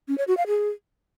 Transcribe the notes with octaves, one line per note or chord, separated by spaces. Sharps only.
C#4
C#5
F#4
F5
G#4